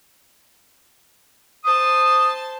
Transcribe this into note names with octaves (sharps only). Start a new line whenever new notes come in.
C5 A5 D#6